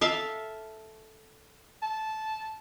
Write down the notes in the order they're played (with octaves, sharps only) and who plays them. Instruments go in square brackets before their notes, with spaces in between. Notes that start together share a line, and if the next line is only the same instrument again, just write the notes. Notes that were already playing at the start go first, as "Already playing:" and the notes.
[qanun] A4 E5 F5
[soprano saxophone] A5